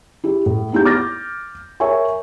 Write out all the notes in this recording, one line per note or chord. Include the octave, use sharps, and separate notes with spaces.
E4 G4
A2
B3 D#4 E4 G4 G6
D6 F6 A6 A#6
A#4 C#5 E5 G#5 C#6